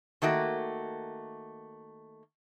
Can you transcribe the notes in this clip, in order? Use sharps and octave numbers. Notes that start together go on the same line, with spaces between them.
D#3 A3 A#3 F#4